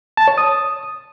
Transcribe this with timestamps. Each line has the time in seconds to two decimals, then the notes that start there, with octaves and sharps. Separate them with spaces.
0.17 A5
0.28 C#5
0.38 D#6